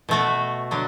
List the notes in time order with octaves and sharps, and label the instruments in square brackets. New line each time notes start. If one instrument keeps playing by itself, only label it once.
[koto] B2 A3 F#4
D3 F#3 D4